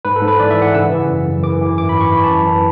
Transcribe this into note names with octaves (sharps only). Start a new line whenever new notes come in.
G#2 B4
A4
G#2
B4
E3 D5
E5
E3
F#5
C#3 E6
E3
F#2
F#2
E3 D6
E3
G#2 D6
B5
E3
C#6
E3 B5
A5
F#2
E3